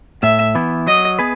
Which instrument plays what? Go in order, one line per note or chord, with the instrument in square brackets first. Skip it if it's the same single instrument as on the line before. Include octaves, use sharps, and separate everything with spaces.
[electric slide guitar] A2 [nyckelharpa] E5
[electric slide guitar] E3 B3 E4
[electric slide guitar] F#3 [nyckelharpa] D#5
[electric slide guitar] B3 G#4 B4